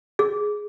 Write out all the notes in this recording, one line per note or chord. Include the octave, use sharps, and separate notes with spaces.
G#4